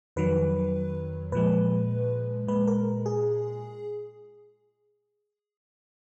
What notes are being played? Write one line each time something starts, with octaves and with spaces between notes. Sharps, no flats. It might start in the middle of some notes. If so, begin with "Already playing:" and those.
F2 D#3 F#3 B4
A#2 F3 G#3 B4
A#2 G#3 B4
A#4
G#4